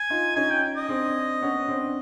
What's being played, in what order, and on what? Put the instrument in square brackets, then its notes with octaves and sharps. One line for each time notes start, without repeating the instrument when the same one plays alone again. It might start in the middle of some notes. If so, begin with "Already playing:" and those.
Already playing: [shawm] G#5
[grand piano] D#4 F4
[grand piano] C#4 D#4 [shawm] G#5
[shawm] G5
D#5
[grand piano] C4 D4
B3 C#4
C4 D4